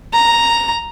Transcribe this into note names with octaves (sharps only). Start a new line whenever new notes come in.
A#5